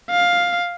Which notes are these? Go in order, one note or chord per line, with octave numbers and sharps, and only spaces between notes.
F5